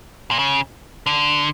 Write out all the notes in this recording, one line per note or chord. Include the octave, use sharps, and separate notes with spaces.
A#2
C#3
D3